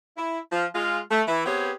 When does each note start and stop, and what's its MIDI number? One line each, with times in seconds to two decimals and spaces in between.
0.17 0.39 64
0.52 0.66 53
0.52 0.66 65
0.75 1.00 56
0.75 1.00 65
1.10 1.22 57
1.28 1.43 52
1.28 1.43 64
1.46 1.72 59
1.46 1.72 60
1.46 1.72 67
1.46 1.72 68
1.46 1.72 71
1.46 1.72 73